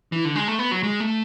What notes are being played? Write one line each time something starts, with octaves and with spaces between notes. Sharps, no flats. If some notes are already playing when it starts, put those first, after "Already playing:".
E3
D3
G#3
A3
B3
F#3
G#3
A3